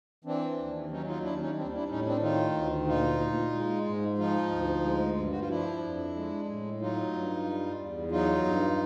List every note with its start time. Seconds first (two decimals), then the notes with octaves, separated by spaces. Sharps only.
0.24 E3 C4 D4
0.58 D#2
0.90 F#3 C#4 D#4
1.07 D#4 F4
1.23 D#2 D4 E4
1.40 C#4 D#4
1.56 G3 C4 D4
1.72 D4 E4
1.89 A2 C#4 D#4
2.06 C4 D4
2.21 D#3 D#4 F4
2.54 D2
2.87 A#2 D#4 F4
3.20 A#2
3.53 G#3
3.85 G#2
4.18 F3 D#4 F4
4.51 D2
4.84 G#3
5.16 G2
5.31 F#4
5.40 F4
5.49 F3 D4 E4
5.82 F2
6.16 G#3
6.48 A2
6.80 F#3 D#4 F4
7.13 G2
7.46 G3
7.79 E2
8.11 F#3 D#4 F4
8.45 G2